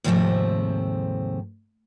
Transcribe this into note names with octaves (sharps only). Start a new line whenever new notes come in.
D#2 G#2 C3 F3 A3 C4